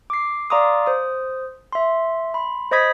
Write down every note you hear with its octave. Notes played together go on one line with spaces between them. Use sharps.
D6 C7
D5 F5 A#5 C6 D6 D#6
C5 D#6
E5 C6
B5 C6
C5 D#5 B5 D#6 G#6 B6